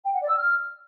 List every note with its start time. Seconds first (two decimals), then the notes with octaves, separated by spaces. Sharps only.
0.04 G5
0.13 F#5
0.21 D5
0.29 E6
0.38 F6